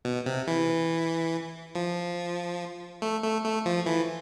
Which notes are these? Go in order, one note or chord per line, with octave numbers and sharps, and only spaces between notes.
B2
C3
E3
F3
A3
A3
A3
F3
E3